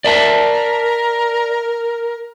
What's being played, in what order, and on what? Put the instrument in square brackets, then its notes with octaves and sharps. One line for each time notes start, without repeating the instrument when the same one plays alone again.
[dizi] A#4 [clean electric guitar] D5 E5 A5